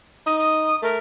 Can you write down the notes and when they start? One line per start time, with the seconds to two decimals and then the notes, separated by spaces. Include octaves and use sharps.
0.26 D#4 D#6
0.39 D#6
0.83 A3 A#4